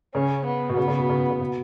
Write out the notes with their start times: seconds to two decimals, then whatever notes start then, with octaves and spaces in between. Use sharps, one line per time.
0.15 C#3 C#4
0.46 B3
0.69 B2
0.77 C#3 B3
0.88 C#3
0.99 B2
1.10 C#3
1.30 C#3
1.41 B2